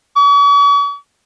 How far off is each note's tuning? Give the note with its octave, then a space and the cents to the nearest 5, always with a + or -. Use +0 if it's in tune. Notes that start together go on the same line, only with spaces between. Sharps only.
C#6 +45